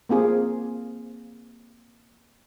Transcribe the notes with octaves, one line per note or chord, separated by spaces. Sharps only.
A#3 C4 F4 G#4